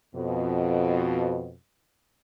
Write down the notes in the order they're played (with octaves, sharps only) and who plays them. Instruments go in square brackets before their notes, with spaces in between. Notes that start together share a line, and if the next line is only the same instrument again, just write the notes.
[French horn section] F2 B2